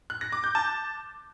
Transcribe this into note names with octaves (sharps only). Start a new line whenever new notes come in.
F#6
A#6
D6
G6
A5